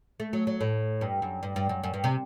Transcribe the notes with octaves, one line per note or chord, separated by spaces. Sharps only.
A3
F#3
F#3
A2
G2
F#2
G2
G2
F#2
F#2
G2
C3